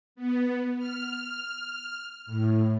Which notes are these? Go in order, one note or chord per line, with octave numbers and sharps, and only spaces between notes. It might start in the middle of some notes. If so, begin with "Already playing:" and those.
B3
F6
A2